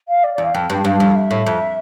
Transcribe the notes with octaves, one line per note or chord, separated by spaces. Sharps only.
F5
D5
E2 D5
F5
F2 G5
G2 G5
G2 F5
F2
E5
A2
F2